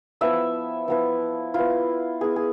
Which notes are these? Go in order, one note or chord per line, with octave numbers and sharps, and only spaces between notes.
F3 B3 E4 E5
F3 B3 E4
B3 E4 F4
B3 E4 G#4
G#4